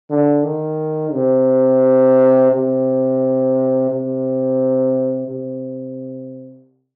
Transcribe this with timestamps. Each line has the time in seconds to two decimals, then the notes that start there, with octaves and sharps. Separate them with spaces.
0.10 D3
0.44 D#3
1.13 C3
2.51 C3
3.90 C3
5.28 C3